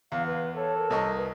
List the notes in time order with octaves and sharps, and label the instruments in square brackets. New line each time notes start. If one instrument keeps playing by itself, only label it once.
[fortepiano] E2 [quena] F5
[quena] B4
[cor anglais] A4 [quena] C#5
[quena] A#4
[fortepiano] C2 D#5 C#6
[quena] B4